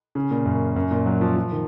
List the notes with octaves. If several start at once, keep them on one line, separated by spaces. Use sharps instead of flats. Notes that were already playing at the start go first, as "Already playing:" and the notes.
C#3
A#2
F#2
F#2
A#2
F#3
F3
F3
D#3